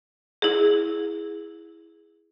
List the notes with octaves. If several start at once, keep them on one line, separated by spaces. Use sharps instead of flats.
E4 G#4